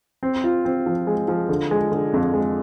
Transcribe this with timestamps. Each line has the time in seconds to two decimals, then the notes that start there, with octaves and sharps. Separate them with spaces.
0.23 C4
0.44 F4
0.65 C4
0.86 F3
1.07 G#3
1.28 F3
1.49 D3
1.71 G#3
1.92 D3
2.13 F2
2.34 G#3